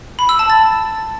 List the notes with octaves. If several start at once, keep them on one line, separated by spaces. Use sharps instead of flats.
B5
E6
A5
A6